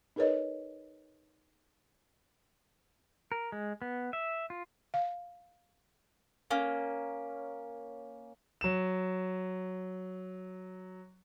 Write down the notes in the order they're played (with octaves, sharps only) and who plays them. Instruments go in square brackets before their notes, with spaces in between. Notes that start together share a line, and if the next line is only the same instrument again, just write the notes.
[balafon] D#4 G#4 A#4 B4 C#5 D#5
[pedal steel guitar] A#4
G#3
B3
E5
F4
[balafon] F5
[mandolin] A#3 C#4
[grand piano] F#3 E7